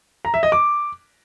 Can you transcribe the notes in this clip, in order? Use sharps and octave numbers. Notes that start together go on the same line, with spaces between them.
A#5
E5
D#5
D6